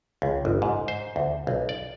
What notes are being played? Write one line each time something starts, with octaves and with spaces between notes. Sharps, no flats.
C#2
G1
G#2
C5
D2
B1
D5